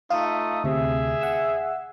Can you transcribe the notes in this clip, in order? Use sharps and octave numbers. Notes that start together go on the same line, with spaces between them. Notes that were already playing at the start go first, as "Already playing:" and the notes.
A3 D#4 F4 D#6
D2 C3 G#4 E5
F#5 E6